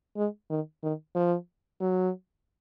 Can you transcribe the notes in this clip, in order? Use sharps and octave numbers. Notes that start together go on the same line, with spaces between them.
G#3
D#3
D#3
F3
F#3